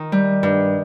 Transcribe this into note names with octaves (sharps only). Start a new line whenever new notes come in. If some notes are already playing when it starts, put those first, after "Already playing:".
Already playing: D#3
G3
G2